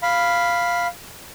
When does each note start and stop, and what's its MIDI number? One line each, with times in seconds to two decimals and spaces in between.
0.03 0.87 77
0.03 0.87 83